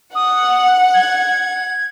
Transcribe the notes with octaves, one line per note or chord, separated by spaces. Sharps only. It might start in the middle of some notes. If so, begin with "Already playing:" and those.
F#5 D#6
G#6